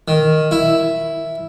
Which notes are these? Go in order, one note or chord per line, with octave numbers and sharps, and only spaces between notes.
D#3
E4